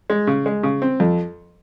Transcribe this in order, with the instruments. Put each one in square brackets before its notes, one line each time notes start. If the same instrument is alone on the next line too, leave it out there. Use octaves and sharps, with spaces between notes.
[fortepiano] G#3
C#3
G#3
C#3
C4
F2